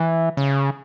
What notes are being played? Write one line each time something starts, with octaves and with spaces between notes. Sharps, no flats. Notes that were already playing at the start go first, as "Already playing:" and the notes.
Already playing: E3
C#3